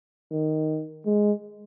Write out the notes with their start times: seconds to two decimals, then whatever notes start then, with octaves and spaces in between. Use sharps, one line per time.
0.31 D#3
1.06 G#3